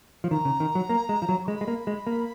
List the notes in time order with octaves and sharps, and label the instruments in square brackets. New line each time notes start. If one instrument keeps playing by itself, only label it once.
[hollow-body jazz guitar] F3
[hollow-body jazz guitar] D#3 [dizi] A#5
[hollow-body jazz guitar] C#3
D#3
F#3
A#3
G#3
F3
F#3
[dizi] C#6
[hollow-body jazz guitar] G#3 [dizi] B5
[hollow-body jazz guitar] G#3
A#3
G#3
A#3